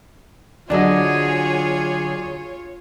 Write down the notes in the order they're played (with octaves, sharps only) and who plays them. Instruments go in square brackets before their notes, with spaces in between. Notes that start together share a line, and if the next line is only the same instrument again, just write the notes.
[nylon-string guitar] D3 F#3 [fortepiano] D4 D#5 [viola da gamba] F4 C#5 [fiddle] G#4